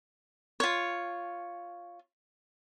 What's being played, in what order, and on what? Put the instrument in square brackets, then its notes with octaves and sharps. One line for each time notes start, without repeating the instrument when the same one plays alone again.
[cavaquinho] F4 C#5